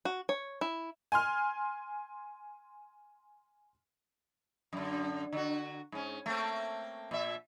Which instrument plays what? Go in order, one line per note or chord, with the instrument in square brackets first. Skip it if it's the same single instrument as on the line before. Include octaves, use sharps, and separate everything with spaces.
[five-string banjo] F#4
C#5
E4
[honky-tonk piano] G#5 C6 F6
[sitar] F#2 D3
D3 F#4
G#2 C#4
A3 A#3 C4
A#2 E5